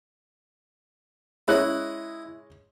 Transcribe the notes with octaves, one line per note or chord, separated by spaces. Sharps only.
G#3 C#4 E4 D#5 F#6